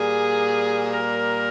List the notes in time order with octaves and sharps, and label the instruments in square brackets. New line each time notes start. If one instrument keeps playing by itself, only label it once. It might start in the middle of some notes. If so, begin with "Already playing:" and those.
Already playing: [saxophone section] A#2 G3 A#3 G#4
A#4